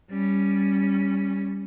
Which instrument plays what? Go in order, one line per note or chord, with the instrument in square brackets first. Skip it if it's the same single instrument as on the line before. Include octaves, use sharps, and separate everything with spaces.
[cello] G3 C#4